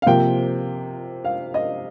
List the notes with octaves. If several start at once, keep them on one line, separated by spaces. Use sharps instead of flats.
F5
C3 F3 A#3 G5
F5
D#5